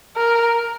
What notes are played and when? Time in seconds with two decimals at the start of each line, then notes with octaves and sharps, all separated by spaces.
0.17 A#4